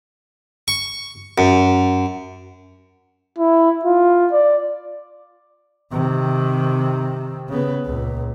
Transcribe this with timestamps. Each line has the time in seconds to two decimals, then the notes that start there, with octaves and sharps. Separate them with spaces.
0.68 C#6
1.38 F#2
3.38 E4
3.85 F4
4.32 D5
5.92 C3 D#3
7.49 C#3 B3
7.86 C#2 A#2